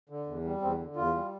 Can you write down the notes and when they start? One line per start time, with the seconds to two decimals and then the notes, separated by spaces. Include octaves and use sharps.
0.09 D3
0.27 E2
0.45 G3
0.61 E2 C4
0.79 D3
0.96 E2 F4
1.14 G3